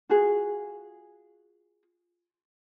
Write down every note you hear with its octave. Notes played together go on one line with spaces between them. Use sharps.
F4 F#4 G#4